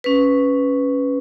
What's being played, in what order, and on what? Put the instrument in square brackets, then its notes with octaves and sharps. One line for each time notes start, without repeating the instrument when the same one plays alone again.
[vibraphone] C#4 B4